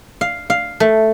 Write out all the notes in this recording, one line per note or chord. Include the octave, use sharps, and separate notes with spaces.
F5
F5
A3